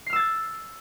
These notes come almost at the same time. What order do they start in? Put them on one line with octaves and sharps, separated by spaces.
C7 F6 E6 A6 G#6